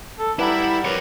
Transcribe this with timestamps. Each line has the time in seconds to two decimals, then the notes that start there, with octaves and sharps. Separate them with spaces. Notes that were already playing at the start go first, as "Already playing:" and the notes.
0.19 A4
0.39 G3 E4 B4 F#5 A#5
0.85 A#4 C#5